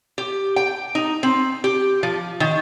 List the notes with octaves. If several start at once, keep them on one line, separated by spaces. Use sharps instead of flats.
G4
G5
D#4
C4
G4
F3
D#3